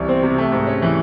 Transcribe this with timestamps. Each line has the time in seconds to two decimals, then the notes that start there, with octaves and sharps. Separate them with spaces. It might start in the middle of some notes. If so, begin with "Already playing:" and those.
Already playing: C2 E3
0.09 C4
0.23 C3
0.38 A3
0.52 G#2
0.67 C#4
0.82 E3